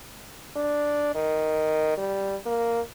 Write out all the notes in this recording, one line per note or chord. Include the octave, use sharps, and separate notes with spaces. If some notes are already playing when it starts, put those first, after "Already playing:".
D4
D#3
G3
A#3